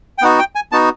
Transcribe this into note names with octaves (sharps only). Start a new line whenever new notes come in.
G5
B3 D#4 F#4 F#5
G5
G#5
B3 D#4 F#4 A5